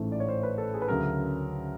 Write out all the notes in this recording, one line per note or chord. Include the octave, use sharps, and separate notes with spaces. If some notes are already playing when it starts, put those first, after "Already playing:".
Already playing: A1 G#2 E3 A3 C5
D5
C#5
C5
B4
A4
G#4
B4
D2 C#3 F#3 A#4